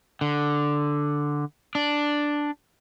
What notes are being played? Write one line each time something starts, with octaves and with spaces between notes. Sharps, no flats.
D3
D4